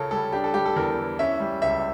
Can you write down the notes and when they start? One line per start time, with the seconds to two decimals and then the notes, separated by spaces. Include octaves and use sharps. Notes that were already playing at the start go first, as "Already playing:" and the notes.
Already playing: C#3 C#4 F4 A4 A#4 C#5
0.11 G3 A4
0.33 D4 G4
0.44 A4
0.54 G3 G4
0.65 A4
0.76 E2 A#4
0.98 E3
1.19 C#4 E5
1.40 G3
1.62 C#2 E5